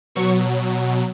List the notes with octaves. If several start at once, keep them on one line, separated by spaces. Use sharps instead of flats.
B2 F#3 C#6